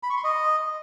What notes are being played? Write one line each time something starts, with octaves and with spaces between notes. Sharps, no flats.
B5
C#6
C6
D#5